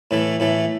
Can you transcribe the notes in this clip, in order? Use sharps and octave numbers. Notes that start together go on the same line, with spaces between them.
A2 E3 A3
A2 E3 A3